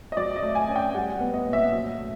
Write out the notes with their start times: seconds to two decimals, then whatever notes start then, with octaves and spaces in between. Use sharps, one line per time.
0.12 D#5
0.17 F#3 D5
0.36 D#5
0.43 A3
0.55 G#5
0.69 C#4
0.76 G5
0.95 G3 F#5
1.20 B3
1.34 D#5
1.47 A#2
1.53 E5
1.72 F#3 E5
1.98 A3